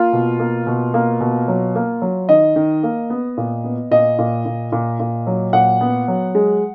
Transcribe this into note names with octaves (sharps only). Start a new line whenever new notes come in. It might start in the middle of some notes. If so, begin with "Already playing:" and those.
Already playing: A#3 F4
B2
A#3
B2
A#3
B2
F#3
A#3
F#3
D#3 D#5
D#3
A#3
B3
A#2
B3
A#2 D#5
A#2
A#2
A#2
A#2
F#3
A#2 F#5
B3
F#3
G#3